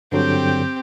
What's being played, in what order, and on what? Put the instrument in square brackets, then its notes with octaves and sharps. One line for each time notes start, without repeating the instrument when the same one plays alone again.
[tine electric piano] G2 D3 F#3 [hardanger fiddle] C4 G4